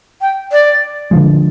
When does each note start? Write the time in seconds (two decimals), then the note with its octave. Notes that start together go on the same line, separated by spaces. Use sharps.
0.21 G5
0.52 D5
1.11 D3 F3 G#3